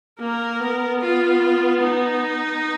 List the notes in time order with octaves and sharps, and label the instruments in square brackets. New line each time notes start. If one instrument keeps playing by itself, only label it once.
[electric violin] A#3 [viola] A#4
[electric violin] B3
[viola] F4
D#4